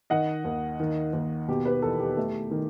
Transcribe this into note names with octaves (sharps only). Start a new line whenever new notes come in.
D#3 D#5 F#5
D#2
D#3
D#2
B2 G4
G4 B4
E2 A4
G4
A3
D#3